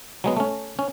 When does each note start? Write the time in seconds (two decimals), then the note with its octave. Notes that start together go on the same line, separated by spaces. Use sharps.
0.24 F#3 G#3 B3
0.37 A3 C#4
0.79 C#4